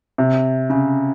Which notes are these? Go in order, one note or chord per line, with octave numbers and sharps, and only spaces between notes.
C3
C#3